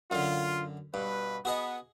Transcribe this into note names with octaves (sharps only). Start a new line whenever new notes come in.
F#2 D3 F4
G2 B2 B4
B3 F#4 G#4 D#5